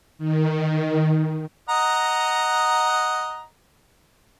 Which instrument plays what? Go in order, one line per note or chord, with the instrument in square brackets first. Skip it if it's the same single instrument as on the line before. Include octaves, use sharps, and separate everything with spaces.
[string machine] D#3
[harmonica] D#5 F#5 A#5